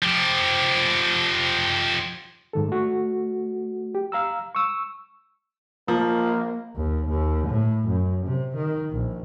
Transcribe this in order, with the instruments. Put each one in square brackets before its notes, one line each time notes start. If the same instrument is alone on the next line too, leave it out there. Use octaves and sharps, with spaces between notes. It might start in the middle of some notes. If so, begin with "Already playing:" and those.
[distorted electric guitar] F3 G4
[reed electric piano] G#2 D#3 A4
A3 F#4
G4
F5 A#5 E6
C#6 E6
[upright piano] F3 [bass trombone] A#3
[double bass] D#2
D#2
A2
F#2
C3
D#3
A#1